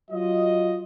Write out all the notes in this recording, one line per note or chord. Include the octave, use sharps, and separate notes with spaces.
F#3 F4 D#5